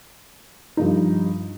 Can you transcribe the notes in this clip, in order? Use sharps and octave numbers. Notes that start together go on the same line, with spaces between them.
G2 F3 D#4